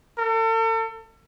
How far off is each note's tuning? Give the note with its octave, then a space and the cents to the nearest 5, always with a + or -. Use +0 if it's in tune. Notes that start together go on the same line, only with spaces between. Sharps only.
A4 +40